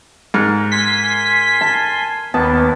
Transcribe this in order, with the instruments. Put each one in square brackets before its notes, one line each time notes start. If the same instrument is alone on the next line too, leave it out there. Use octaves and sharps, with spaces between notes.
[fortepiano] G#2 [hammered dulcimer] A#4
[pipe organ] G#5 C6 [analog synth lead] B6
[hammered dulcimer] A5
[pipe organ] D#2 D#3 [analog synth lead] B3 [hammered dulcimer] A5